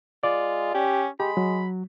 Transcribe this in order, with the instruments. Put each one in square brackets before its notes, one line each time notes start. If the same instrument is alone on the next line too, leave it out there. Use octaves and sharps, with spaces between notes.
[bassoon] G#3 [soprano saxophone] F4 [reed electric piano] D5
[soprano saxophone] C#4 [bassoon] G4
[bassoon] G#3 [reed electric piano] G4 [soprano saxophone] B5
[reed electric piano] F#3